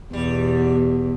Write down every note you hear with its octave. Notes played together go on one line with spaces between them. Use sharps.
E2 B2 G3